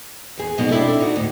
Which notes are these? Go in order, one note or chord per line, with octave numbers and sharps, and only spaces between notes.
E2 G#4
F2 B2 G#3 D#4
C4 D4 E4 A4
D4
D#4 F#4
D2 A2